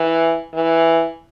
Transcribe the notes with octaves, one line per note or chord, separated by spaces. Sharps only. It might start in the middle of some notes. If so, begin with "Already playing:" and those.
Already playing: E3
E3